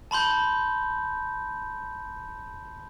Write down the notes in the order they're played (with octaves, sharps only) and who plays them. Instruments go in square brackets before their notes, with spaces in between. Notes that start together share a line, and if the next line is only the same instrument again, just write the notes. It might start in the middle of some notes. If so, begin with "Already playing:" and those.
[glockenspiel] A5 B5 C6 G6